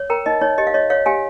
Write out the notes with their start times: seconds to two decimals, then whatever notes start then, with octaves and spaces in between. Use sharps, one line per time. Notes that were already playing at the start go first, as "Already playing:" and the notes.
Already playing: C#5
0.10 A#4 G5 A#5
0.26 D#4 D#5
0.41 D#4 C#5
0.58 G4 D#5
0.67 F5
0.74 C#5 D#5
0.90 C#5 F5
1.06 G4 F5 G#5